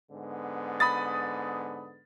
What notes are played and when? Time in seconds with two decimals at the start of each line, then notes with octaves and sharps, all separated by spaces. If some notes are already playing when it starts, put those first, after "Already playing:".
0.11 G#2 D3 B3
0.80 B5 D#6 A6